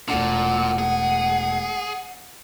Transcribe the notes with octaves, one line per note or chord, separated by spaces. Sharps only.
E1 A#2 A3 D4 F#5
G#4